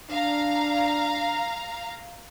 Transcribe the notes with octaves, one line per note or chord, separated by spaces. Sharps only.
D4 F5 A#5